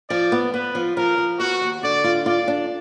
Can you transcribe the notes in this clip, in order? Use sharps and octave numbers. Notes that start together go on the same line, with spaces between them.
F3 D5
B3
B3 B4
F3
F3 A#4
F3
B3 F#4
D#2
D3 D5
F4
F4 D5
D4